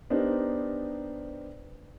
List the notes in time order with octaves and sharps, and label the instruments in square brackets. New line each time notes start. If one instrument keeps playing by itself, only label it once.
[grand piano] B3 D4 D#4 G4 A#4 C5